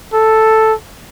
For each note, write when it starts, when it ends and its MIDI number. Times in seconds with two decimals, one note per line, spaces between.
0.14 0.74 69